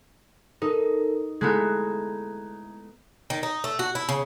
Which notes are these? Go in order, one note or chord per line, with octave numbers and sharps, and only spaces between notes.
D#4 A4 A#4
G#3 A3 B3 E4 A#5 G#6
D#3
D#4
A3
F#4
E4
C#3